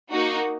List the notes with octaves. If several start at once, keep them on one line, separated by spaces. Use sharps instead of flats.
A#3 D#4 F#4